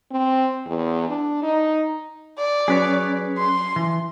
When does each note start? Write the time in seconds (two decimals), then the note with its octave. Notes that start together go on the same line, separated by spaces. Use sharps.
0.11 C4
0.66 E2
1.08 D4
1.43 D#4
2.38 D5
2.68 F#3 C#4 G#4 B4 C#5
3.38 C6
3.76 E3